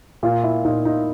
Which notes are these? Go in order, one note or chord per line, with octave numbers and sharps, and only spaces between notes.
A#2 F4
E4
A#2 D#4
D#4